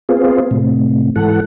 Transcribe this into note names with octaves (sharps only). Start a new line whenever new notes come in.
B3 C4 F4 G#4
A2 C3
G#2 E3 A4 F#5